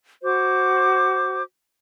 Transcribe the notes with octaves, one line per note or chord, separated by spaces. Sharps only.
F#4 C5 D6